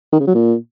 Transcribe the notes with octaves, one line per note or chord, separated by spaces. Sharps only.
D#3
C#3
F#3
A#2